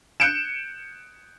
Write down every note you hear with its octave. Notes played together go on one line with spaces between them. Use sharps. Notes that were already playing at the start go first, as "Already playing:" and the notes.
F#6 G6 C#7 D7 E7